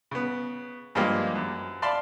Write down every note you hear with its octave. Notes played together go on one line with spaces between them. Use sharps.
C#3 B3
G2 F3 G#3 A#3 F4 G4
F#2
D5 F5 A5 B5 C6